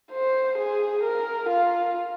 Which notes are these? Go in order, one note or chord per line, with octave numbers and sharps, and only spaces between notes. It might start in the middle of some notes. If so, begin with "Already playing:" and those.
C5
G#4
A#4
F4